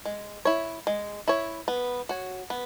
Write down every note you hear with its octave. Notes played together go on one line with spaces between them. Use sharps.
G#3
E4 C#5
G#3
E4 C#5
B3
F#4 C#5
B3